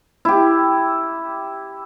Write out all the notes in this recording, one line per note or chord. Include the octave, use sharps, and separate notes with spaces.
E4 G4